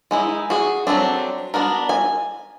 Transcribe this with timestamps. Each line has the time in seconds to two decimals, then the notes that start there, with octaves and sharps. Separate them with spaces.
0.11 G#3 D#4 E4
0.50 F#4 G#4
0.87 F#3 A3 C4 D4
1.54 B3 D4 F#4 A#4
1.89 G#5